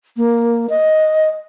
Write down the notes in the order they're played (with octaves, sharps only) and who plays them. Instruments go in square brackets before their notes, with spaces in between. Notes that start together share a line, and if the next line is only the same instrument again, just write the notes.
[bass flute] A#3
D#5